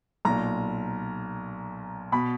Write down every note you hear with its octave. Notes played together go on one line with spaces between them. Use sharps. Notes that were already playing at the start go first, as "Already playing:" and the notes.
B1 A#2 A#5
B2 B5